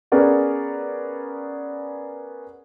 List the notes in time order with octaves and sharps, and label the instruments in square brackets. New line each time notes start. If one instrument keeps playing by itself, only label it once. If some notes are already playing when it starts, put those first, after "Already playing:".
[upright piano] B3 C#4 G#4 A#4 D5 F#5